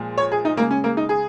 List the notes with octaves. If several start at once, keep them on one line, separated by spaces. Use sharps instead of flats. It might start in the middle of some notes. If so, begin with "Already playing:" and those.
Already playing: A#2 F3 G#3
C#5
G#4
D#4
C#3 G#3 A#3
C#4
A#3
D#4
G#4